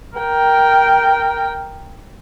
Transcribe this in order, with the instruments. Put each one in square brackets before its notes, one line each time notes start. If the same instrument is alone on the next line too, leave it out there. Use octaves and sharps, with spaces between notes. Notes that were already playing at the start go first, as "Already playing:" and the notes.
[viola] A#4 G5